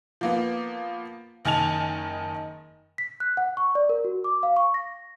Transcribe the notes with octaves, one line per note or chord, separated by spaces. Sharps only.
F3 A#3 B3
F#1 D#3 D#4 G#5 A5 F7
B6
F#6
F#5
C#6
D5
A#4
F#4
D6
F5
C#6
A#6